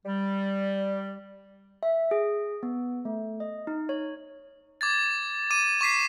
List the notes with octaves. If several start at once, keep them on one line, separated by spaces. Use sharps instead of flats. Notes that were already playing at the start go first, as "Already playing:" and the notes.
G3
E5
G#4
B3
A3
D#5
D#4
C#5
D6 G#6 A6
D6 D#7
C#6 D6 B6 C7